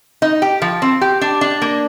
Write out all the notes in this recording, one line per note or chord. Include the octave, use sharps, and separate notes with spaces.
D#4
G4
F3
C4
G4
D4
D4
A#3